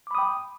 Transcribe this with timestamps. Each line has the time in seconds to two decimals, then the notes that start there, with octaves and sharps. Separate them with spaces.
0.07 D6
0.11 B5
0.15 D#6
0.18 G5